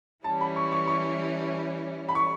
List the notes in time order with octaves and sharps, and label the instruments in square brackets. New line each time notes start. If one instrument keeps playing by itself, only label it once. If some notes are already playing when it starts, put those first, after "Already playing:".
[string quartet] E3 G3 C#4 E4 [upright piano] A5
[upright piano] B5
C#6
C#6
C#6
B5
C#6